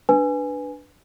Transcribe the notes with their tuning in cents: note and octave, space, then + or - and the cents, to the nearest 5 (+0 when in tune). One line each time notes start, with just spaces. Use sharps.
D4 +0 B4 +0 G#5 +0